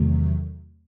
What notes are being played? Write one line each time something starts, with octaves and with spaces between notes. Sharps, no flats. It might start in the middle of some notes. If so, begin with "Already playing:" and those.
Already playing: E2 C3 D#3 F#3 A3